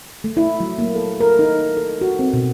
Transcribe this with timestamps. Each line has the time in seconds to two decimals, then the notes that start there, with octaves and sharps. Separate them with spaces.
0.24 A3
0.37 E4
0.60 F#3
0.78 A#3
0.95 A4
1.20 A#4
1.39 D#4
1.77 A4
2.01 F#4
2.19 C4
2.34 B2